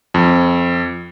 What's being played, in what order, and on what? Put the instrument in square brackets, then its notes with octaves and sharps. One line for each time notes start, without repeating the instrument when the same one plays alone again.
[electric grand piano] F2